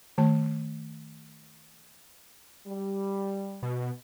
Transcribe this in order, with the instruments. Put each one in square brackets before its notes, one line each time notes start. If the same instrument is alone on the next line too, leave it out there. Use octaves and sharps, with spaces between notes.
[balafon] D#3 A3 A5
[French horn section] G3
[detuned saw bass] B2